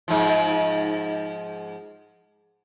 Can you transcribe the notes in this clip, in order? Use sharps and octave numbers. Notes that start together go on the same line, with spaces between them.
G#2 F3